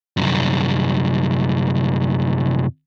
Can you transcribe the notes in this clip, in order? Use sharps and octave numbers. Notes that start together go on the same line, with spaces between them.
C2 F#2